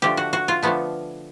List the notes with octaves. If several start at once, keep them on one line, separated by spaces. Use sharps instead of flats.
D3 F3 A3 G4
F#4
F#4
F4
D3 F3 A3 B3